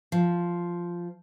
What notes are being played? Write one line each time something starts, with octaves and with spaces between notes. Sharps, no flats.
F3